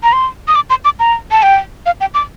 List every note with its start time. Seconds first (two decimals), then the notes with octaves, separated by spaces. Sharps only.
0.03 A#5
0.13 C6
0.48 D#6
0.55 D6
0.70 C6
0.85 D6
1.00 A#5
1.31 A5
1.43 G5
1.86 F5
2.00 G5
2.14 D6